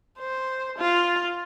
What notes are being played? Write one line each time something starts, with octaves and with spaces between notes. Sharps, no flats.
C5
F4